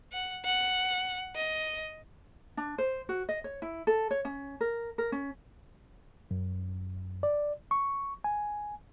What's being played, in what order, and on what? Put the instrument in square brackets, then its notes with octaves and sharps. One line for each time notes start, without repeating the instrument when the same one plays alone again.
[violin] F#5
F#5
D#5
[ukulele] D4
C5
F#4
D#5
C#5
E4
A4
C#5
C#4
A#4
A#4
C#4
[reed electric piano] F#2
D5
C#6
G#5